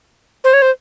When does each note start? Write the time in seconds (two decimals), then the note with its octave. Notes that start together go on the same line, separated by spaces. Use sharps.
0.44 C5
0.53 C#5
0.62 C5